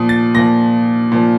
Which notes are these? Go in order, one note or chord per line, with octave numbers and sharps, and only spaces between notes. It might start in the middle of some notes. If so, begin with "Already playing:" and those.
Already playing: A#2 F3 D#6
A6
A#2 F3 A#6
A#2 F3